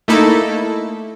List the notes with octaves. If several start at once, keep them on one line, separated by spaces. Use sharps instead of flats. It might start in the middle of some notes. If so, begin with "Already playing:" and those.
A3 A#3 D#4 E4 A4